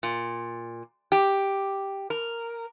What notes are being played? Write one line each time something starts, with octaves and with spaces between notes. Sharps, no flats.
A#2
G4
A#4